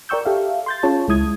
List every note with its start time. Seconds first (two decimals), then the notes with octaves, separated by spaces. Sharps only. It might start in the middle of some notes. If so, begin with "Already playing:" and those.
0.09 A#4 D5 G5 C#6 E6 G6
0.25 G4 A4 E5 F5
0.66 C6 G6 A6
0.83 C#4 F4 G#4 C#5 A5
1.08 C#2 G#3 E4 D#6 G#6